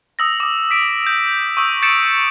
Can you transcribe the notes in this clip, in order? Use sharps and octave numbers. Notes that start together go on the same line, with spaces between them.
D#6 E6 A#6
D6 D#6
B6 D7
G6
C#6 D#6 E6
G6 A6 C#7 D7 E7